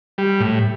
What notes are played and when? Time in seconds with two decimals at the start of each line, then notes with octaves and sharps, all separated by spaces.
0.18 G3
0.40 A2